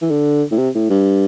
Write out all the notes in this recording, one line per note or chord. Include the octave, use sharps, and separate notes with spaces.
E3
D3
A2
C3
A2
G2